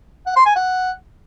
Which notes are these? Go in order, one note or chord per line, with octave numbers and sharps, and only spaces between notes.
F#5
C6
G#5
F#5